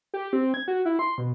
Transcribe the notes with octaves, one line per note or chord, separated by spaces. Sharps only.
G4
C4
G#6
F#4
E4
C6
B2